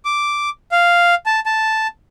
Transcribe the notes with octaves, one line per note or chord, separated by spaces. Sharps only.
D6
F5
A5
A5